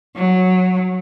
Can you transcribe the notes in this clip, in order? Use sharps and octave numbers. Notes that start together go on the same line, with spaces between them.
F#3